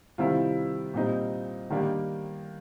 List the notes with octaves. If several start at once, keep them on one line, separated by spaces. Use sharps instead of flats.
C3 D#3 G3 C4 E4 F4
A#2 G3 C4 D#4
D#3 G3 A#3 D4